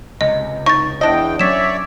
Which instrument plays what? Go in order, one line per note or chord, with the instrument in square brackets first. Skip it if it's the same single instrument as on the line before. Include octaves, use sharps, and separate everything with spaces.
[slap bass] C#2 C3 [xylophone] D#5
[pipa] D#4 [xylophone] C#6 A6
[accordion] E2 E3 G5 [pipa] D4 D#5
[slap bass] F#3 C4 C#4 [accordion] C#5 D5 E5 [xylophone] B6 E7